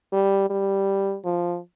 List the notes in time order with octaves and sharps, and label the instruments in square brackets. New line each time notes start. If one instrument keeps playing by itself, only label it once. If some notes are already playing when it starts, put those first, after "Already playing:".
[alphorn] G3
G3
F3